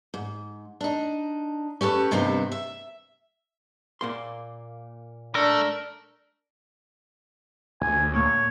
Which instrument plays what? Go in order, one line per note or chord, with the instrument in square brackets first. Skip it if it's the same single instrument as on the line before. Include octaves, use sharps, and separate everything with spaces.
[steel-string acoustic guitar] G#2
D4 D#4
C#4 G4 A4 B4
G2 C3 D#3 B3 C4 D#4
E5
[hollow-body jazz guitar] A#2 A#3 C6
[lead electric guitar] A3 [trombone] D4 [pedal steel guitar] A#4
[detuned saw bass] D2 [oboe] G#5
[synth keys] A#2 A3 A#3 [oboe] C#5